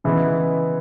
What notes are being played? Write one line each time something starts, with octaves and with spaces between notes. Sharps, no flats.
C#3 E3 G#3 B3